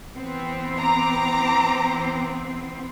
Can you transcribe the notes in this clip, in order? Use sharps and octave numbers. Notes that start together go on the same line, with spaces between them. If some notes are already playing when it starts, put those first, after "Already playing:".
E3 B3 C4
A#5 D6